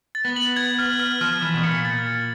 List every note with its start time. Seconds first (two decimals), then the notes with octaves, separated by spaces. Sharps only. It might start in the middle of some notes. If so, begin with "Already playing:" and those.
0.15 A6
0.25 B3
0.36 F#7
0.56 G#6
0.79 F6
0.99 F6
1.21 F3 F6
1.42 E3 F6
1.54 B2
1.64 A#2 C#7
1.85 A6
2.07 A6